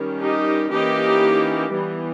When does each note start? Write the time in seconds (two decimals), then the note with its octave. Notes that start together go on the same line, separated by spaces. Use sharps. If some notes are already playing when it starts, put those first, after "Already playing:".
Already playing: D#3 G3 C#4
0.22 D#4 G4
0.72 E3 A#3 C#4 D#4 G4
1.72 E3 G3 B3